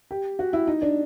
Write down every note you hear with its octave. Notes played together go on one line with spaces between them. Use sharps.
G4
F#4
E4
D#4
D4